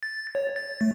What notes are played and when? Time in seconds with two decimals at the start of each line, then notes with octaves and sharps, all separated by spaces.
0.03 A6
0.35 C#5
0.56 A6
0.81 A3